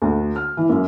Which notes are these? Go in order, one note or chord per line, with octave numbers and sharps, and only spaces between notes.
D2
F6
E3
F#2